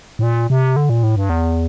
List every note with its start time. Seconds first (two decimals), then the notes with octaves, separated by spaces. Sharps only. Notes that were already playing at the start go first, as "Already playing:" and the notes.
0.19 A2
0.23 A#2
0.50 C3
0.76 D3
0.89 A#2
1.03 A2
1.16 G2
1.29 E2